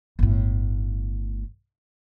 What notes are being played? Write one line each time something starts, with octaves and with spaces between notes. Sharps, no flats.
G1 A2